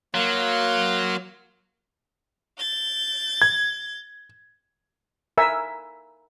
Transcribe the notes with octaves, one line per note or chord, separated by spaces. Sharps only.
F#3 A#3 F5 C6
G6 A6
G#6
A#4 E5 G#5 E6